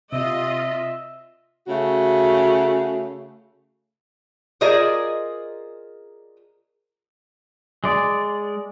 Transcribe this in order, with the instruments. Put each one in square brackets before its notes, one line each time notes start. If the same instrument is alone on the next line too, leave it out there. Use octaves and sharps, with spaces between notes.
[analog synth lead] C3 [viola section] F4 D#5 [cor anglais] E5
[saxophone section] C#3 A3 F#4
[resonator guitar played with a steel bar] F4 G#4 A#4 C5 D5 D#5
[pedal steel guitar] G#3 D5